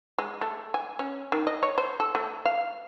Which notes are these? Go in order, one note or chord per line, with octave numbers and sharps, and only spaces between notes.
G#3
A3
G#5
C#4
D#3
D#5
C#5
C5
A4
A3
F5